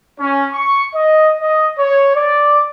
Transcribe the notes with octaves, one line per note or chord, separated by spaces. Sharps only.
C#4
C#6
D#5
D#5
C#5
D5